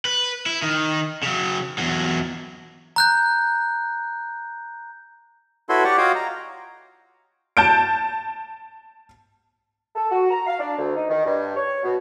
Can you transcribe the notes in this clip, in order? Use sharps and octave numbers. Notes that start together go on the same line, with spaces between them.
B4
E4
D#3
C#3 F#3
E2 F#3
A#5 F#6 G6
E4 F#4 A4 B4 C#5 C6
G4 D5 F#5 C#6
F4 F#4 C#5 D#5 F5 G5
A#5
A5 G6 D7
A4
F#4
A#5
F5
D4
D2
D#4
D#3
G2
C#5
B2